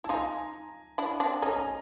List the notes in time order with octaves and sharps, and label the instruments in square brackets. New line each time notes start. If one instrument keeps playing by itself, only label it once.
[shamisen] E4 [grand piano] A5
[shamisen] D#4 F4 [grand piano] G#5 A#5
[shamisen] D4 E4
C4 D4
[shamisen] C#4 D#4 [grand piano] G#5 A#5
[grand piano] G#5 A#5